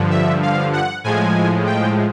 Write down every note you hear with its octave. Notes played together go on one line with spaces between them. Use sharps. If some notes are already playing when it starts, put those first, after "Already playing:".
Already playing: G2 D3 F3
E5
F5
F#5
A2 F3 G#3 G#5
G5